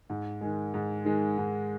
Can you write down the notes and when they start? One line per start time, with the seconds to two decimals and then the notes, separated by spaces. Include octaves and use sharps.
0.10 G#2
0.41 D#3 G#3
0.74 G#2
1.05 D#3 G#3
1.38 G#2